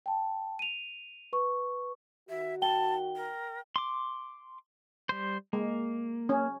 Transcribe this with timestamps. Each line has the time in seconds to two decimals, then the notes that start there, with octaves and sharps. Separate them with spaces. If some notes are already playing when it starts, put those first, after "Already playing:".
0.06 G5 A5
0.59 D#7 F7
1.33 B4 C#6
2.29 D#3 F#4 E5
2.62 G5 A5 G7
3.16 A#4
3.76 C6 D6
5.09 G3 C5
5.53 G#3 A#3
6.29 C#4